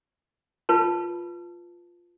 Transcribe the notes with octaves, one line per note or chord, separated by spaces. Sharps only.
F4 B4 A5